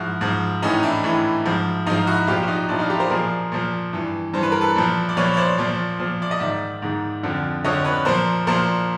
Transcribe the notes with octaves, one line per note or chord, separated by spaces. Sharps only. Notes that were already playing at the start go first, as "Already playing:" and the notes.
Already playing: G#2 F3 E4 F#4
G#2 F3
A2 E3 C#4 D#4
D4 E4
A2 E3
G#2 F3
G#2 F3 D#4 F4
E4 F#4
A#2 F3 F4 G4
F#4
D#4 F4
A#2 F3 D4 E4
D#4 F4
F4 G4
A#4 C5
A#2 F3 G#4 A#4
A#2 F3
G2 E3
G2 E3 C5
B4
A#4
A4 B4
A#2 F3
D5
A#2 F3 B4 C#5
C#5
C5 D5
A#2 F3
A#2 F3
D5
D#5
G#2 D#3 D5 E5
G#2 D#3
F2 D3 F3
F2 D3 F3 C#5 D#5
B4 C#5
A#2 F3 A#4 C5
A#2 F3 A#4 C5